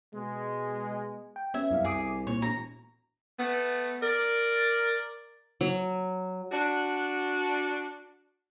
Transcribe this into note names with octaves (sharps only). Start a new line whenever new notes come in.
B2 G#3
G5
B3 C#4 E5 G#6
C2 F#2 F5
G#4 E5 D6 D#6
A#2 C#5
E1 A#5
A3 B3
A#4 D5
F#3
D4 F#4